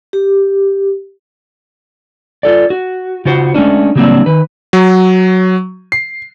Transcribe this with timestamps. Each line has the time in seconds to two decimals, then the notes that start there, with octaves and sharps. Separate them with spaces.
0.13 G4
2.43 F4 A4 D5
2.70 F#4
3.25 C#3 F4 F#4 C5
3.54 G#3 A3 C#4 D4
3.96 C#3 F#3 G3 A#3 C4 D4
4.26 D#3 B4
4.73 F#3
5.92 C7